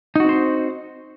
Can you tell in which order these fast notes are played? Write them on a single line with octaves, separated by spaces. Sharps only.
D#4 F#4 C4 C5